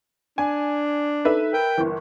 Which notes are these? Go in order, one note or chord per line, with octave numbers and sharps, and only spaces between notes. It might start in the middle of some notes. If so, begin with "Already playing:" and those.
D4 G#5
D#4 A4 B4 E5
A#4 G5
G1 E3